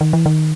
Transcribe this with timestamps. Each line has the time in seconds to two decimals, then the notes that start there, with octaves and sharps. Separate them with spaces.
0.01 D#3
0.13 E3
0.26 D#3